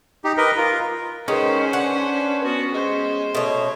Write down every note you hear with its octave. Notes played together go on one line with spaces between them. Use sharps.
D#4 G4
A#4 B4 D#5
F4 A#4
D#3 G#3 C#4 B4 C5
D4 F#5
B3 F#4
G#3 C5
B2 A3 C#5